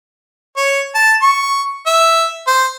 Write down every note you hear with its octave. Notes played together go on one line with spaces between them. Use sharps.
C#5
A5
C#6
E5
C5